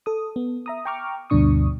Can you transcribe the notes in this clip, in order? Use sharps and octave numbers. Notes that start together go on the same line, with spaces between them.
A4 D#6
B3
E5 A#5 D#6
G5 A#5 C#6 D6 F6
D2 G2 B2 D4 C#6 D#6